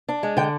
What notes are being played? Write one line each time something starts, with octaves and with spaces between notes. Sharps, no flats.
D4
G#3
D3 G5